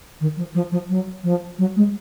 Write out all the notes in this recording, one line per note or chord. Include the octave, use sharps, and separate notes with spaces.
D#3
F3
F3
F3
F#3
F3
F#3
G#3